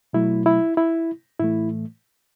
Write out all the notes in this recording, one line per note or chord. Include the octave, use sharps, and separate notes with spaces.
B2 F#3 A3 E4
E4
E4
A2 E3 A3 E4